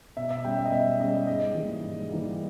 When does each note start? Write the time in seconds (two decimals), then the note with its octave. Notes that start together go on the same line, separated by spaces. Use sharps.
0.17 B2 E5
0.31 E5
0.44 G3 C#4 G5
0.58 E5
0.65 D#5
0.72 B2 E5
0.99 G3 C#4 D#5
1.27 G#2 D#5
1.55 E3 G3 A#3
1.82 G#2
2.10 E3 G3 A#3